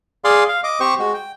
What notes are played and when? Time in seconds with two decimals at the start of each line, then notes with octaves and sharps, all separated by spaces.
0.24 G#4 D5 F5 C6
0.48 F5
0.64 D#5 D6
0.80 C4 G4 C5 C#6
0.99 G#3 F#4
1.14 G5